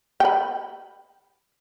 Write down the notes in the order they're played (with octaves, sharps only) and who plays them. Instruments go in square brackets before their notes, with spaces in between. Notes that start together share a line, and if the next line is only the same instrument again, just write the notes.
[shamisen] G5 B5